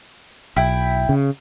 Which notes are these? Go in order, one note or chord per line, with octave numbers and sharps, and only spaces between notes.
B1 E4 G5
C#3